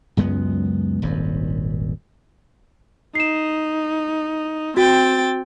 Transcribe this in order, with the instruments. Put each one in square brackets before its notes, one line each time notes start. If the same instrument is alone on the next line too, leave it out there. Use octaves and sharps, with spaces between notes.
[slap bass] C#2 F#2 G#3 B3
D#1 G#1 F#2
[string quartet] D#4 [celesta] C7 E7
[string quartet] C4 G5 A6 [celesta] F#4